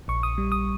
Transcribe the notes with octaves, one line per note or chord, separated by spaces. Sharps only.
A#1 C#6
D#6
G3
D#6